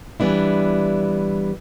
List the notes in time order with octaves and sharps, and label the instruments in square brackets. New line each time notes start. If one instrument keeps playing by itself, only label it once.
[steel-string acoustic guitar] E3 G3 B3 D4 E4